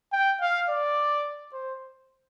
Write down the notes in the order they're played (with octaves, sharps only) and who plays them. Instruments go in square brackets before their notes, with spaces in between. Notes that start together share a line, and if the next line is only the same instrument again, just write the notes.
[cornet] G5
F5
D5
C5